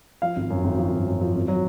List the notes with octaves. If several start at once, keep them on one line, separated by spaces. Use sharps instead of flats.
F3 F5
G#1
F#2
G#1
F3
G#1
F#2
F3
G#1
F#3